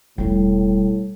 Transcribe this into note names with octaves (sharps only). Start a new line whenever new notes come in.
E1 A2 G3 C#4